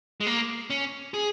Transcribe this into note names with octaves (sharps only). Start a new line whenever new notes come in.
G#3
A#3
C#4
G#4